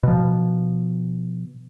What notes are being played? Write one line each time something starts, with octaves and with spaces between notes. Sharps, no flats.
B2 F3